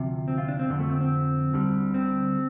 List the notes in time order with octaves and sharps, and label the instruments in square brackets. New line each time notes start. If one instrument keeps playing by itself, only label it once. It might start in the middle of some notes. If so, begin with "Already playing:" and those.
Already playing: [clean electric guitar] D2 C3 F3
C4
F4
D4
C4
F2 D3 F3
A3
C4
C4
D2 D3 G3
C4